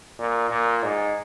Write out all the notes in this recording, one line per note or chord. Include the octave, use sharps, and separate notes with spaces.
A#2
A#2
G#2